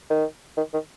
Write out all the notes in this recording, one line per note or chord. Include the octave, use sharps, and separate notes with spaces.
D#3
D#3
D#3